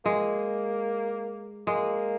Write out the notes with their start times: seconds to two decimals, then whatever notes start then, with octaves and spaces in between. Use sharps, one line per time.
0.05 G#3 A#3
1.67 G#3 A#3